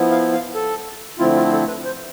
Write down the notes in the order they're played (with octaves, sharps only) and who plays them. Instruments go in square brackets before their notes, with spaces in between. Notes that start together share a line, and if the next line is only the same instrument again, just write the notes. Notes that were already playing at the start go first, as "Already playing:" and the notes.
Already playing: [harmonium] F3 B3 E4
F5
F5
A4
D3 F3 A3 C4 E4 F4
F4
A4
B4
C5